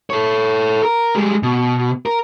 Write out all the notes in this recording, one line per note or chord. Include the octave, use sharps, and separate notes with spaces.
A4 C#5
A#4
G3 G#3
B2
A#4